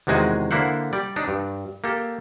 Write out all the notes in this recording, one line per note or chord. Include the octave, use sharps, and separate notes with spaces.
E2 C3 D#3 G#3 F#4 G#5
D3 A#3 E4 C5 F#5
G3 D5
D4 D#4
G2
A#3 G4 A4